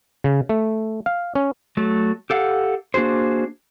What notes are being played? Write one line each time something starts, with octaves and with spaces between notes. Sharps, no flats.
C#3
A3
F5
C#4
F#3 A3
G4 A4 F5 F#5
A#3 D4 F#4 G#4 C5